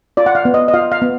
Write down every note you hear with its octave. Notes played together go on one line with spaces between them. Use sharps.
F4 D5
F#5
F5
B3
D#5
D#5
F4 F5
F5
B3